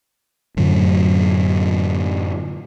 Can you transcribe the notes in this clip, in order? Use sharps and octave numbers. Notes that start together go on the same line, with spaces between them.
F#2 A2 D3 F#3